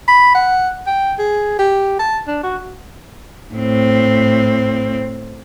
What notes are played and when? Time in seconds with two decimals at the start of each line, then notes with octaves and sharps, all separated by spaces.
0.07 B5
0.35 F#5
0.87 G5
1.18 G#4
1.59 G4
1.99 A5
2.27 D4
2.43 F#4
3.54 A2 C4